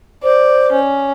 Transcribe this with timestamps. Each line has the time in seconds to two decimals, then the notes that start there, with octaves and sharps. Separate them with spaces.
0.24 C5 D5
0.72 C#4